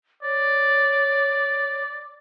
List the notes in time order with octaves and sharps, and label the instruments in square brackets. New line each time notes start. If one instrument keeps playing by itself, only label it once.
[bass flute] C#5 [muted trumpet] D5